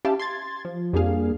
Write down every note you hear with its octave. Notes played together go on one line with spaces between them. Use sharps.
C#4 E4 G4 F5 A5
C6 G#6 A6
F3
F2 G3 A#3 D4 G#4 F5